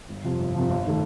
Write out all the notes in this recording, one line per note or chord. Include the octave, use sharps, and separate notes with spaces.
G1
F2 C3 F3
G1
F2 C3 F3
G1
D#3 A3